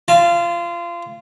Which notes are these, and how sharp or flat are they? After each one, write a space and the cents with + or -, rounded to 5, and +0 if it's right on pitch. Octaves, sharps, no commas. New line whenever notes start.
F4 -25 A5 -5